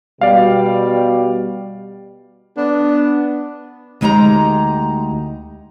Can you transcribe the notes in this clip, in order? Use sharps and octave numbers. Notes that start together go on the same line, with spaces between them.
B2 G3 D5 F5
B3 D4
D2 G#3 D#4 G4 A5 A#5